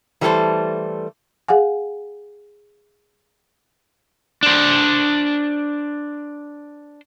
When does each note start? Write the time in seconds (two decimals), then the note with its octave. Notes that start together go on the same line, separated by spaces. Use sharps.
0.21 E3 G3 A3 A#3 A4 C5
1.48 G#4 F5 F#5 G#5
4.43 D4 C5